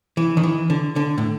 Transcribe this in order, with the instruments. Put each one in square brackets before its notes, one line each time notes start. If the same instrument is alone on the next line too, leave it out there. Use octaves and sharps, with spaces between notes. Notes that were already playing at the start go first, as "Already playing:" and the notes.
[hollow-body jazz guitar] E3
D#3
E3
D3
D3
A2